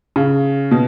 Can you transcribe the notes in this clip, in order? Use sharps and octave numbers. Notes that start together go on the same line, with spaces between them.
C#3
B2